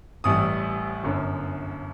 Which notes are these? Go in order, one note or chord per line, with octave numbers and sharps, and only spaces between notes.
A1 A2 E3 G3 D#6
G1 F#2 D3